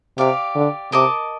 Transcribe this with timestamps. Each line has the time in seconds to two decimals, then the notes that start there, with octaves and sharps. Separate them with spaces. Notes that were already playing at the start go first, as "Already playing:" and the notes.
0.18 C3 G4 D5 F5
0.55 D3
0.92 C3 A#4 D#5 A5 D6